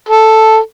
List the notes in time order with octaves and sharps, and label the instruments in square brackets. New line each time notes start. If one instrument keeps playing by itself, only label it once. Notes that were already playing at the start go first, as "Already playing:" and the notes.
[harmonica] A4